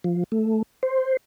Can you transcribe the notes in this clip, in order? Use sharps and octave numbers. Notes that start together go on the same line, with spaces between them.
F3
A3
C5